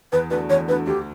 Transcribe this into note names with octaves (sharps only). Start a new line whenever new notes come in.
E2 B4
D3 A3 D4 F#4 B4
E2 C#5
D3 A3 D4 F#4 B4
D2 G4